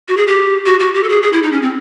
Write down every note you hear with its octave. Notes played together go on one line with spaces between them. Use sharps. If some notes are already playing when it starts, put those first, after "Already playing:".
F#4
G#4
G4
F#4
F#4
G4
A4
G#4
G#4
E4
D#4
C#4
C4